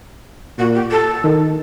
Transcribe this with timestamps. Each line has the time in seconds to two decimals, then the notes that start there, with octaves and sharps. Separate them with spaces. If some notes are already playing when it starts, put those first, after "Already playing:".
0.58 A#2 F#4
0.75 G4
0.92 A4
1.24 D#3